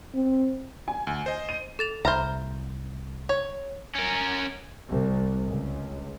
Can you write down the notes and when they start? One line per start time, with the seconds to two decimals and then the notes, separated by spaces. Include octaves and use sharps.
0.15 C4
0.88 G#5
1.07 D2
1.26 C5 D#5
1.49 D#7
1.79 A4 A6 F7
2.05 C2 C5 E5 A#5 B5 F6
3.29 C#5
3.95 C#4 A#4
4.88 C2
5.47 C#2